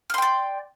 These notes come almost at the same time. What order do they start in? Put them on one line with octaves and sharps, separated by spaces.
F6 C6 G5 D5